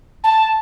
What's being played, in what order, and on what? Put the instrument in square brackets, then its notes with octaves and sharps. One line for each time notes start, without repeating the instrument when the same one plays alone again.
[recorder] A5